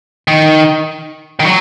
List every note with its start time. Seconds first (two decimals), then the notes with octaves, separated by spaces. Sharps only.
0.28 D#3
1.40 D#3
1.45 F#3